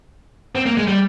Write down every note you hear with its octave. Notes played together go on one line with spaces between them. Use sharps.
C4
A#3
G#3
G3